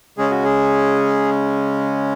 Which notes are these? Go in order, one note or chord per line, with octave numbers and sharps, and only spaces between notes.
C#3 G#3 C#4 G#4
F#4
G#4